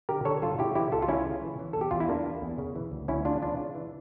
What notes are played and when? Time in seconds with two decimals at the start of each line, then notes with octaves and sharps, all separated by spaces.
0.09 D3 G4 A#4
0.25 D3 A4 C#5
0.42 G2 F4 A4
0.59 C#3 E4 G4
0.75 E3 E4 G4
0.92 C#2 F4 A4
1.02 F4
1.09 C#2 C#4 E4
1.26 C#3
1.42 E3
1.59 E3
1.73 E2 A4
1.81 G4
1.91 E2 F4
2.00 E4
2.08 E3 A#3 D4
2.26 E3
2.42 E2
2.58 C#3
2.76 E3
2.92 D2
3.08 D2 C#4 E4
3.25 C#3 D4 F4
3.42 E3 D4 F4
3.59 C#3
3.75 E3